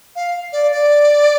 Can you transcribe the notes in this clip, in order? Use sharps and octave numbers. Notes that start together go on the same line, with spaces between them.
F5
D5
D5